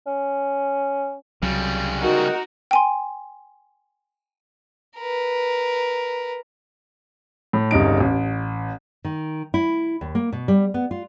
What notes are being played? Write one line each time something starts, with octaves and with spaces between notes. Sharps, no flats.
C#4
C2 C#3 F#3 G3
D#4 F#4 A#4
G5 G#5 C6
A#4 B4
A2
G1 C2 C#3 D#4 D7
A1
D#3
E4
D#2
A#3
B2
G3
B3
F4